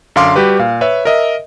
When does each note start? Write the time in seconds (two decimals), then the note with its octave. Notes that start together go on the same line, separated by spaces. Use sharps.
0.16 F#2 D3 F5 C6 D6
0.36 G3 F#4 G4 B4
0.59 A#2 F5
0.81 B4 C#5 E5
1.05 A#4 D#5 E5